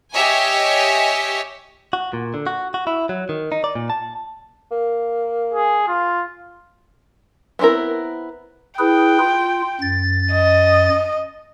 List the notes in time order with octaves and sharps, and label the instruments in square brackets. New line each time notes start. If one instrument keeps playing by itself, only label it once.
[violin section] G4 C#5 D#5 E5 G#5
[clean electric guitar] F#4
A#2
D3
F#4
F#4
E4
F#3
D#3
D#4
D5
A#2
A5
[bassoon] A#3
[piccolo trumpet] G#4
F4
[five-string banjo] B3 C4 D4 E4 A#4
[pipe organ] E4 G#4 B4 [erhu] G5
[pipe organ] F4
F#2 A6
[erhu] D#5